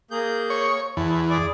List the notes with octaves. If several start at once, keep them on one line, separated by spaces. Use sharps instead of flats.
A#3 G#4 G6
C#5
E2 A5
G#4 D5 D6